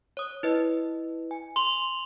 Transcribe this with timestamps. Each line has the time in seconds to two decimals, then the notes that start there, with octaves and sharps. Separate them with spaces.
0.17 C#5 D#6
0.43 E4 B4 D#5
1.31 G#5
1.56 C6 F7 F#7